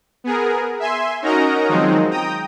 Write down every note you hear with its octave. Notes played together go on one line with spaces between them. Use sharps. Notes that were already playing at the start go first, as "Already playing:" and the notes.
B3 G#4 A#4
E5 G#5 C6
C#4 D#4 F#4 A#4 D#5 A#5
D#3 F3 F#3 G#3 C4 D#4
G5 A#5 D#6